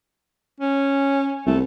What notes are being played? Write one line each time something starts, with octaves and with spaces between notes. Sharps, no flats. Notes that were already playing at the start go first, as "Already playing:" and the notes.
C#4
C2 A3